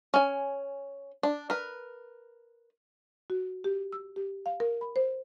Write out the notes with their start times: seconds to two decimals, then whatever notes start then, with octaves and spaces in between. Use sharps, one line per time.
0.14 C#4 G#5
1.23 D4
1.50 A#4 B4
3.30 F#4
3.64 G4
3.93 E6
4.16 G4
4.46 F5
4.60 A#4
4.81 B5
4.96 C5